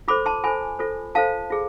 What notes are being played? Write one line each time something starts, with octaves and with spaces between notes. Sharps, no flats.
F4 A4 C5 B5 D6
A5 C6
F4 A4 C5 G#5 B5
F4 A4 C5
F4 A4 C5 F5 A5
F4 G#4